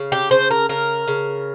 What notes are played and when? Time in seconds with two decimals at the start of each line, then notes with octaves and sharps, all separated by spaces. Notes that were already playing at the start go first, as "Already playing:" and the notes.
Already playing: C#3
0.12 G4
0.31 C#3 C5
0.51 A#4
0.69 C#3 A#4
1.08 C#3